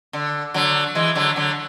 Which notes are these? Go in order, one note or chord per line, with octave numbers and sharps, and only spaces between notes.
D3
D3 F#3
E3 G#3
D3 F#3
D3 F#3